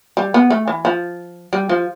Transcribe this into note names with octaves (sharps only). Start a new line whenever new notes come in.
G3
B3
A3
E3
F3
G3
F3